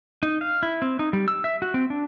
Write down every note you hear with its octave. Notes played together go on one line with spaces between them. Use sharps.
D#4
F5
E4
C4
D#4
G3
E6
E5
F#4
C4
D4